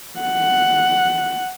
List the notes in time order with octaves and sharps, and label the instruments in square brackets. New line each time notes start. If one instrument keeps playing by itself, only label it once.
[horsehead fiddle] F#5